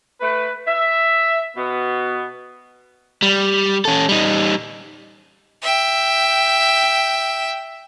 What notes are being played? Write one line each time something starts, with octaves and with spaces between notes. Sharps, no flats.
A3 B4
E5
B2 B3
G3
C#4 A4
G3 D#4
E5 G5